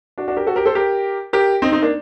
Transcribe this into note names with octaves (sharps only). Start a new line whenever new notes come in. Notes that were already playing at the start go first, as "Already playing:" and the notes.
D4 F#4
D4 F#4
G4 A#4
F#4 A4
G4 A#4
A4 C5
G4 A#4
G4 A#4
C4 D#4
C4 D#4
A#3 D4